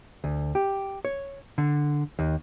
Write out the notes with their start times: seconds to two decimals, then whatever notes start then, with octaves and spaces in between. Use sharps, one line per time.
0.24 D2
0.55 G4
1.05 C#5
1.58 D3
2.19 D#2